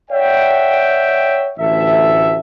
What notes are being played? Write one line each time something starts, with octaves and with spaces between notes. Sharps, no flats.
C#5 D5 E5 F#5 G5
A1 D2 A4 E5